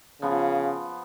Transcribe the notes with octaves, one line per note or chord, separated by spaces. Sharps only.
C#3 F3 B3